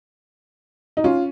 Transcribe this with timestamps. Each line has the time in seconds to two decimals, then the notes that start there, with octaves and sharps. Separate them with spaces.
0.97 D#4
1.04 C#4 F4